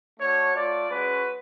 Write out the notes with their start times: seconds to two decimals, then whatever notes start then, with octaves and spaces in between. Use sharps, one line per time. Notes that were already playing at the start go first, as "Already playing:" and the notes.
0.19 A3 D4 F#4 C#5
0.54 A3 F4 D5
0.89 G#3 C#4 F#4 B4